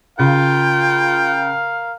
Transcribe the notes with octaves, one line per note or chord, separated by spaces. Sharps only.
C#3 F4 A#4 F5 G5